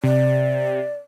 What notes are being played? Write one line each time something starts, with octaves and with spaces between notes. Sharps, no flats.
C3 D5